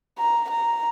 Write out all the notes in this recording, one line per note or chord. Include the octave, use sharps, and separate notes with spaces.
A#5
A#5